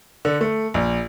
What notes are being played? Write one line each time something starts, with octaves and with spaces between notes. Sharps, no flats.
D3
A3
A#1